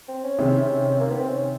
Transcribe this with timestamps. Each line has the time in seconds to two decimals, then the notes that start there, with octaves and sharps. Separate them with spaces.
0.08 C4
0.24 C#4
0.39 C3 D#3 G#3 C4 E4
1.00 A#3
1.10 B3
1.19 C4
1.29 C#4